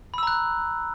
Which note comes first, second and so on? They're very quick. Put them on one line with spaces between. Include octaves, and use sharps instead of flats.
B5 E6 A#5 F#6